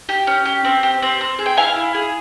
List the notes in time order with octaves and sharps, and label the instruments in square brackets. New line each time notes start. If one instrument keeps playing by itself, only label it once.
[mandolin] G4
C#4
G4
C4
G4
C4
C4
G#4
G5
E4 F5 G#5
E4
G#4